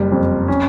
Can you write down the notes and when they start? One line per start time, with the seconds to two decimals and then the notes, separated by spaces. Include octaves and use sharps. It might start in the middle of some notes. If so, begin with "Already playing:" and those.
Already playing: F#1 G3
0.12 F2
0.48 C#4